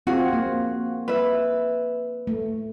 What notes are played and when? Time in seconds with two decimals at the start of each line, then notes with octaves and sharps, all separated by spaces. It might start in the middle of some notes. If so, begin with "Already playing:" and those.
0.07 C4 F4 F#4 G#4
0.33 A#3
1.08 B4 E5
2.27 A3